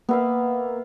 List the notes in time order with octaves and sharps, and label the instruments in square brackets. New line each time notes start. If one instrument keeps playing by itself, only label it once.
[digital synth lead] A#3 [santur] B3 E5 F5